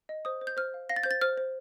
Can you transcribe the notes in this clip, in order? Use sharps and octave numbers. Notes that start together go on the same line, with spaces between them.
D#5
C5 D#6
C5
G6
C5 F6
F5
F5 A#6
A6
C5 G6
A6
C5 F6
C5